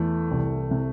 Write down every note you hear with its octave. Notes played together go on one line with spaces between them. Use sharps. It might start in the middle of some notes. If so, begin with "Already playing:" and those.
Already playing: E2 E3 A3
C2
C3